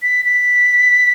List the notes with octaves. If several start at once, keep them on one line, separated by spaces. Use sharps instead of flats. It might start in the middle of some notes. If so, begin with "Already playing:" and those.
B6
B6